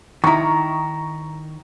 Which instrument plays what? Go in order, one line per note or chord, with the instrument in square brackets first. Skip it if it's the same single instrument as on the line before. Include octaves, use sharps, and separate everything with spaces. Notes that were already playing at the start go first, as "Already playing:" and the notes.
[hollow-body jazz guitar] D#3 E4 [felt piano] A#5 C#6